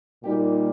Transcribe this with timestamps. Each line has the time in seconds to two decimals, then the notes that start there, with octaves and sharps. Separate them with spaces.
0.23 A#2 G3 A#3 D#4 G4